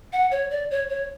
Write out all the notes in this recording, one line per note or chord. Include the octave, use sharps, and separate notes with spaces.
F#5
C#5
D5
C#5
C#5